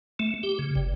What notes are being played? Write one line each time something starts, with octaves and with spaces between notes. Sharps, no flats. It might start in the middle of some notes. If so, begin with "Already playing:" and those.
A3
G4
C#3
G1